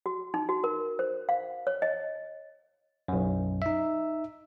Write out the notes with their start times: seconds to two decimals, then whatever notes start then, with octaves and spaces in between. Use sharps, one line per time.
0.06 F#4
0.34 D#4
0.49 F#4
0.64 A#4
0.99 C5
1.29 F5
1.67 C#5
1.82 D#5
3.08 B1 F#2
3.62 D#4 E5